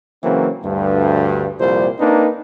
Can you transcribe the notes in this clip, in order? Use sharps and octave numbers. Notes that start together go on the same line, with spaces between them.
C#3 E3 F#3 A#3 C4
D2 G2
C2 F2 A#2 G3 C5
A#3 C4 D4 D#4 B4